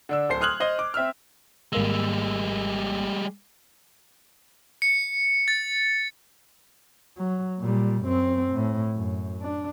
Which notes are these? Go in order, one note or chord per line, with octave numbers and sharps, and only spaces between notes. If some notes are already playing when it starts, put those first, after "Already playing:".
D3 D4 E6
D1 A4 C5 C7
C6 D#6 F6 F#6 G#6 F#7
C5 D#5 C6 G7
D6
C4 E5 E6 F6
G#1 G3 G#3 A#3 E6
C#7
A6
F#3
A#2 G3
F#2 C4
A2
F#2
D4